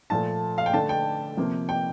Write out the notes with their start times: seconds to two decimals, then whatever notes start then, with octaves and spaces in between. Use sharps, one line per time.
0.10 A#2 F3 A3 A5
0.58 F5
0.66 G5
0.73 D3 A3 A5
0.89 G5
1.37 C3 F3 A#3
1.69 G5